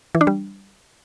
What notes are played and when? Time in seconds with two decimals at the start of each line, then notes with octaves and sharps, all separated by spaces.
0.15 E3
0.21 D4
0.27 G3